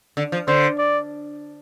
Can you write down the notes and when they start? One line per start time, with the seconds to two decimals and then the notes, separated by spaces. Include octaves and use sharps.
0.17 D3
0.32 F3
0.48 D3 C5
0.78 D5